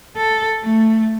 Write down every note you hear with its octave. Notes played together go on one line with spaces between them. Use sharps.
A4
A3